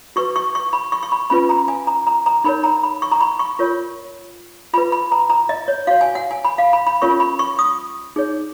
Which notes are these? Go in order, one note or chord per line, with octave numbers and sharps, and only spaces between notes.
F#4 B4 C#6
C#6
C#6
B5
C#6
C#6
B5
C#4 F4 B4 B5
A#5
G#5
A#5
A#5
A#5
D#4 A#4 C#5 B5
A#5
B5
C#6
A#5
B5
C#6
F4 A#4 C#5
F4 B4 B5
B5
A#5
A#5
D#5
C#5
F#4 C#5 F5
G#5
F#5
G#5
B5
F5
B5
B5
C#4 F4 A#4 C#5 C#6
B5
C#6
D#6
D#4 G#4 C#5